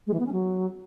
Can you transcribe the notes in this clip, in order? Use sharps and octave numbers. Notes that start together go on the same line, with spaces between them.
G#3
E3
B3
C#4
F#3